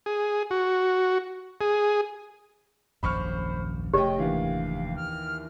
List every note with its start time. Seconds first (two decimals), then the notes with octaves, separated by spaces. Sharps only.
0.06 G#4
0.51 F#4
1.61 G#4
3.03 D#1 A#1 F#2 C5 B5 C#6 F6
3.94 F1 A3 G4 C#5 D#5 G5
4.18 D#2 D3 E3 F5
4.96 F6